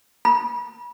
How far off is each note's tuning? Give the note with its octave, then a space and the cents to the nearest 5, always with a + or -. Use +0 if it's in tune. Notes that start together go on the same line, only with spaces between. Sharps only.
B5 -35